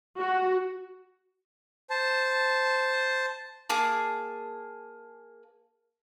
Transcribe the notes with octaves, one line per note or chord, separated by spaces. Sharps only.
F#4
C5 A5
A#3 G#4 A5 D6